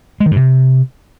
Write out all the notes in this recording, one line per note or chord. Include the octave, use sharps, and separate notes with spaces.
G#3
D#3
G2
C3